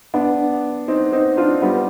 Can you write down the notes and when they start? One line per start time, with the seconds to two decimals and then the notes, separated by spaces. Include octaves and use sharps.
0.14 B3 D4
0.88 C4 D#4
1.12 C4 D#4
1.37 D4 F4
1.62 G3 B3